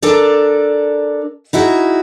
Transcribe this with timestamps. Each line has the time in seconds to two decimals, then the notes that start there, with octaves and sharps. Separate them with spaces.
0.02 D4 A4 A#4 D5
1.53 D#4 E4 F#4 G#4